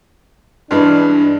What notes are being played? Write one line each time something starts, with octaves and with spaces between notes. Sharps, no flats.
G2 E3 G#3 D4